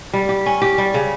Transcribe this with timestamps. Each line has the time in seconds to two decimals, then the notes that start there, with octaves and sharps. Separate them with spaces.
0.14 G3
0.29 G4
0.46 C#4
0.62 G4
0.78 G3
0.94 C#3